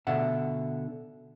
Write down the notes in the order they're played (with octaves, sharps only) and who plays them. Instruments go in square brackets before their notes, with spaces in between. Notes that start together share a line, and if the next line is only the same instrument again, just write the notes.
[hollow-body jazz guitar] B2 D3 E5 F#5